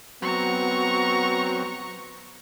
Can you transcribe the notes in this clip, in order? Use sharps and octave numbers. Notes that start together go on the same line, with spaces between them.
F#3 B3 C4 A#5 C#6